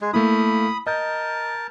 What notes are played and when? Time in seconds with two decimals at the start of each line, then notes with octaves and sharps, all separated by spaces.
0.01 G#3
0.13 A3 A#3 E4 B5 D#6
0.87 A#4 D#5 A5 G6